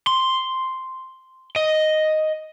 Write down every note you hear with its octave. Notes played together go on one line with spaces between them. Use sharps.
C6
D#5